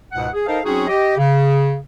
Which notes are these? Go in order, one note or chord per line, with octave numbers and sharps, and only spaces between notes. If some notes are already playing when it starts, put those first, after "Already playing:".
C#2 G#2 B2 F#5
G#4
D#4 A4 A#4 C5 D#5 F5
F#3 C4 C#4 D#4 F#4 G#4
G4 D#5
C#3